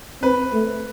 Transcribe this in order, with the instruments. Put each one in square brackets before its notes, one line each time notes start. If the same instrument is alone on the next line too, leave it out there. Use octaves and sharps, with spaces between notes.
[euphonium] C4 [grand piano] B4
[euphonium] A3